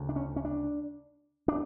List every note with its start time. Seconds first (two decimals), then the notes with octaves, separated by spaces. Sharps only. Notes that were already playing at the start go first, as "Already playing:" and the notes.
Already playing: D2 C#3
0.09 D4
0.16 C#4
0.36 C#4
0.45 D4
1.48 D4